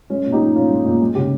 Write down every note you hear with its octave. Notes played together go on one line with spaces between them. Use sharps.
G#3 C#4
A#2
D#4 G4
F3
A#2 C#4 F4
G#3
A#2
G#3
C#3 G4